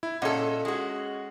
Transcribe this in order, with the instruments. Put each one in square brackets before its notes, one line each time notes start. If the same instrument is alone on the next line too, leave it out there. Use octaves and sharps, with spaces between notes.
[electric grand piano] E4
[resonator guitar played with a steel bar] A#2 A4 [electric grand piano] C#4 D#5 F#5
[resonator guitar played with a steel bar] G#3 F#4